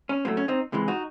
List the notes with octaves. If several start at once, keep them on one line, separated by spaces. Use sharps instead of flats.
C#4
A2 F#3 A3 C4
C#4
C4 D#4
C#2 C3 E3 G#3
D#4 F#4